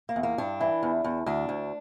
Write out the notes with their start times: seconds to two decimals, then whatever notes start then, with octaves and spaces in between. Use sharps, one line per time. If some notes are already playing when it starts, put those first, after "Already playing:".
0.09 A#3
0.16 E2
0.23 A#3
0.38 G2 D4
0.61 E3
0.83 E2
1.04 E2
1.26 D2 D4
1.49 D2